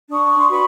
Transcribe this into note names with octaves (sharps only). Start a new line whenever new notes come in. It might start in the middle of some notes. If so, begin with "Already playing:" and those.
D4 C#6 D#6
C6
F#4 B4 B5 C#6